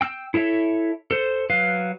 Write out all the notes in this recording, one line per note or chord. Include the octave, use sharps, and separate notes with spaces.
G5 E6
E4 A4 C#5 E5
A4 C5
F#3 B4 F5